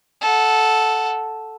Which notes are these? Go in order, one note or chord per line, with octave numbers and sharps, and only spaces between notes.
A4 F#5